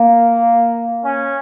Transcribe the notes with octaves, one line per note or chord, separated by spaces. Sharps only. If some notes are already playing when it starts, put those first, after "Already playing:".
Already playing: A#3
C#4